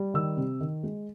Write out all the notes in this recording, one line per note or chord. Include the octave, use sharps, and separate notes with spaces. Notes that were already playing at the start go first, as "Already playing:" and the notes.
Already playing: G3
D#3 E6
C3
D#3
G#3